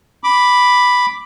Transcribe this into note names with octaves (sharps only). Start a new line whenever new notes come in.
B5 D6